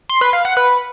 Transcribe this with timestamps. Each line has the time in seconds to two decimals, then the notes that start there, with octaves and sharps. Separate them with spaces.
0.09 C6
0.21 B4
0.33 F5
0.45 F#5
0.57 B4